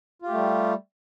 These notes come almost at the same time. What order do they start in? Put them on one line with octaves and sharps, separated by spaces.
F4 G4 A3 G3